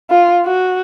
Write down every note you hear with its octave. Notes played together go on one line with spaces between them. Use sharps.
F4
F#4